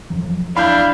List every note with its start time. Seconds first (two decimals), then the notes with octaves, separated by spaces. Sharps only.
0.10 E2 F3 F#3
0.56 D4 E4 F5 B5 G6